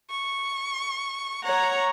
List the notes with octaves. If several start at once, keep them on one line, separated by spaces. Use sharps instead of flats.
C#6
C#5 F#5 A#5